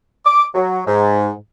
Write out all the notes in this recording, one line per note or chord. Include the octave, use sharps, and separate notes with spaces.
D6
F#3
G#2